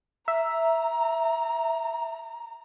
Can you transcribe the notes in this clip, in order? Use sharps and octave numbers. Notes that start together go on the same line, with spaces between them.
E5 A#5